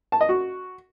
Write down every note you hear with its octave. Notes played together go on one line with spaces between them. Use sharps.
A5
D#5
F#4